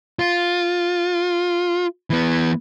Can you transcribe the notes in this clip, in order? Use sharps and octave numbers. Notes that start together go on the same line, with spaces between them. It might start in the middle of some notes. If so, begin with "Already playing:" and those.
F4
E3 B3